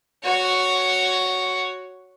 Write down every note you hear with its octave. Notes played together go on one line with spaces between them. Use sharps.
F#4 C#5